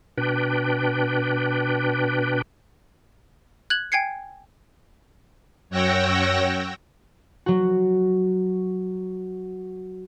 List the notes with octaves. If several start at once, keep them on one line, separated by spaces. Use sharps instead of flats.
B2 D4 B4 G5
F#6 G#6 F#7
G5 G#5 G#6 C7 C#7
F#2 C#5 F#5 G5 E6 A#6
F#3 F#4